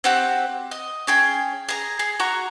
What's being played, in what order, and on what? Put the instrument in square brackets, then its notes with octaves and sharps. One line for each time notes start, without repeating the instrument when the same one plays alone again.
[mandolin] C4 F#4 G4
D#5
C#4 G#4 G5
G#4 A#5
G#4
F#4 A#5 C#6